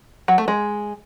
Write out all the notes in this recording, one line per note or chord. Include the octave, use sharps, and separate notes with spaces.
F#3
A3
G#3